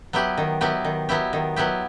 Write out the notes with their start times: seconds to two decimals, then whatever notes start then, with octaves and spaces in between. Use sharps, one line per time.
0.13 F#3 B3 E4 G4
0.38 D#3
0.61 F#3 B3 E4 G4
0.85 D#3
1.09 F#3 B3 E4 G4
1.33 D#3
1.56 F#3 B3 E4 G4